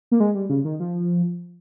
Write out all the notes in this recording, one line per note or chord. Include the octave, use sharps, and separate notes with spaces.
A#3
G#3
G3
C#3
D#3
F3